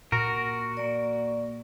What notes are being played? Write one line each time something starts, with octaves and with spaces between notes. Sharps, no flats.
A#2 F#4 A#4
A#3 D5